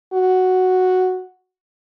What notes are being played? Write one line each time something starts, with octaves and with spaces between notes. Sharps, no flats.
F#4